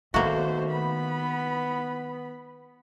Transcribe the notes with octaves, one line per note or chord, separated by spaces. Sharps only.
B2 D#3 A3 A#3 F#4 C5
B3 B5